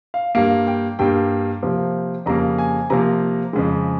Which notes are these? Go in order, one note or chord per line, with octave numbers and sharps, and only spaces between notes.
F5
G2 G3 A#3 F5
G5
G2 G3 A#3 G5
C3 F3 A#3
F2 C#3 G3 A#3 A#5
G#5
C3 F3 A#3 A#5
F2 C#3 G#3